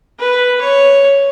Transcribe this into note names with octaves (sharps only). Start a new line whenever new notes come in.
B4
C#5